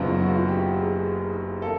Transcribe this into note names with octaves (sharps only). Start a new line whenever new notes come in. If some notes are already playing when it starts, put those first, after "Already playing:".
Already playing: F#1 F#2 C#3 F#3 B3 F4
F#4
F4
F#4
G4
G#4
A#3 A4